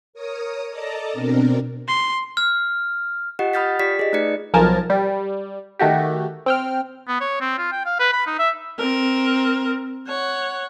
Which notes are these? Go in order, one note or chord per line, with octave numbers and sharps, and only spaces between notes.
A#4 C#5 D#6
A4 D5 D#5 A5 A#5
B2 C4 D4 A#4
C6
F6
F4 G4 D#5 F#5
B5 D#6 F6 G6 A6 B6
F4 G4 D5 B6
G#4 D#5
A3 D#4 B4 D5 C#7
B1 F3 A#4 G#5 A5
G3
D#3 A3 F#4 G4
C4 G5 F6
B3
C#5
C4
F4
G5
F5
B4
B5
D#4
E5
C4 A#4
C#5 F#5